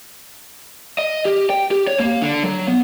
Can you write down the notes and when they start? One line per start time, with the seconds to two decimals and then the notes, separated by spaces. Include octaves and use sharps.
0.98 D#5
1.25 G4
1.50 G5
1.71 G4
1.87 C#5
2.00 A#3
2.22 D3
2.43 F#3
2.67 B3